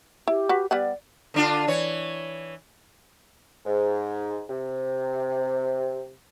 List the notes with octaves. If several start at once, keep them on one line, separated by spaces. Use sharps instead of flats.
E4 G4
F#4 B4
G3 B3 D5 F#5
D3 D4 F4
E3 C#5
G#2
C3